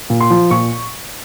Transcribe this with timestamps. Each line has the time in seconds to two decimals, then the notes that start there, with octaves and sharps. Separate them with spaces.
0.10 A#2
0.21 C6
0.30 F3
0.51 A#2 C#6